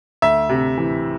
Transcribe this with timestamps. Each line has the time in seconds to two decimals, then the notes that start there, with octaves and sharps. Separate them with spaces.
0.22 D2 E5
0.49 C3
0.78 E3